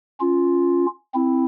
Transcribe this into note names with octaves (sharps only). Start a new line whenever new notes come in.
C#4 F4
C4 E4